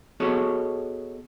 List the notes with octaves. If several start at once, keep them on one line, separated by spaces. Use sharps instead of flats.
B3 F#4 G#4 A4 C#5 D#5